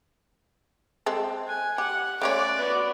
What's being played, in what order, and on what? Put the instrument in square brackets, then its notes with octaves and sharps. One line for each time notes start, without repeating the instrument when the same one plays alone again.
[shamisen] G#3 C4 A4
[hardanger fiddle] G#5 [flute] F#6
[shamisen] G4 [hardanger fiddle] F#5
[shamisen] A3 C#4 C#5 [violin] D5 [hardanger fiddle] D6
[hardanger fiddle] B3 F#4